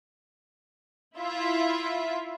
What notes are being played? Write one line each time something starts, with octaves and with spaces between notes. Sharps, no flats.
E4 F4 E5